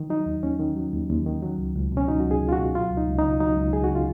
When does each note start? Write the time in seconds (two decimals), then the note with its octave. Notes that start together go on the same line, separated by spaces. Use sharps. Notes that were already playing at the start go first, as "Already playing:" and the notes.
Already playing: D#3
0.10 F#3 D#4
0.26 D#2
0.43 D#2 C#4
0.60 D#3
0.76 F#3
0.93 D#2
1.10 D#2
1.26 D#3
1.43 F#3
1.58 C#2
1.75 C#2
1.92 B2 C#4
2.08 F#3 D#4
2.20 F#4
2.25 C#2
2.31 G#4
2.42 C#2
2.49 F4
2.53 F#4
2.58 B2
2.75 F#3 F4
2.91 C#2
2.97 D#4
3.08 C#2
3.19 D#4
3.24 C#3
3.40 F#3 D#4
3.57 C#2
3.73 C#2 G#4
3.84 F#4
3.91 C#3 F4